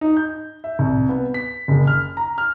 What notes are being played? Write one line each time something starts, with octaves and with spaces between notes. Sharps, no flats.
D#4
G6
E5
C2
B3
B6
F#1
F6
A#5
F6